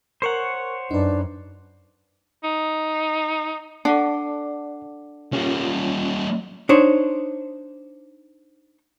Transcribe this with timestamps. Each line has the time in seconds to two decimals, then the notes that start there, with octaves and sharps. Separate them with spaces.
0.22 A#4 C5 C#5 F#5 C#6
0.91 F#2 D4 D#4 B4
2.44 D#4
3.85 D4 A4 D5 F#5 A5
5.33 G3 A#3 C#4 F4
6.69 D4 D#4 C5 C#5